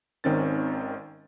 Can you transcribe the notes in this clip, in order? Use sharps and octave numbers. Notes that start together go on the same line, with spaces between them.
G#1 D#3 C4 C#4 A6